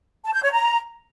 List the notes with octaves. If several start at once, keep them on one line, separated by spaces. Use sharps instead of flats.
A5
G6
C#5
A#5